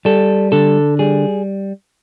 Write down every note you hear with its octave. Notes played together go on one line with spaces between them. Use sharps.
G3 A4
D3 A4
G3 G#4